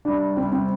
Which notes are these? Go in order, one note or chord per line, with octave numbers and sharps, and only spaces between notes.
C2 C3 G3 D4
C2 C3 G3 C4
C4